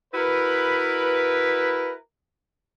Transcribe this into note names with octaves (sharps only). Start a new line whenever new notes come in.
E4 F#4 A#4 B4